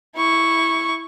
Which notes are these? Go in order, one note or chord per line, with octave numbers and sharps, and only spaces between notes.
E4 C#6